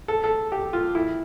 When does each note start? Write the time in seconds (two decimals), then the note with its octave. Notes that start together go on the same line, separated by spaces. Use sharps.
0.08 A4
0.24 A4
0.52 G4
0.73 F4
0.95 E4